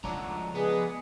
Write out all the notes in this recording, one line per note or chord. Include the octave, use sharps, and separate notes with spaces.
C#2 F3 A3 D4 F#4 C#5 A#5
G#3 B3 G#4 B4 D5